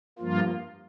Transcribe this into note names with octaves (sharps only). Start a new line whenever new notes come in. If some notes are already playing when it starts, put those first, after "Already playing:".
G2 F3 A#3 F4